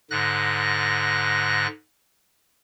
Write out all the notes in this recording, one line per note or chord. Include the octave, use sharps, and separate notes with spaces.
G#2 D3 F#6 A#6